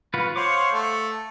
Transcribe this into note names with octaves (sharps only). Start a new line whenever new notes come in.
F4 F#4 B4
C5 C#5 F5 F#5 D6
A3